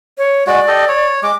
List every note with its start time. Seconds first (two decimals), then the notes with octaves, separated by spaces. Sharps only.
0.18 C#5
0.47 G#3 F#4 D5
0.68 G4 A4 D#5
0.88 C#5
1.23 G#3 D6